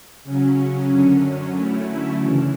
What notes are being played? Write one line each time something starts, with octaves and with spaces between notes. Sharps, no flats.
C#3 F#3 C#4
F#2 D3 F#3 C#4
D3 F#3 A3 C#4 E4
F#2 C#3 E3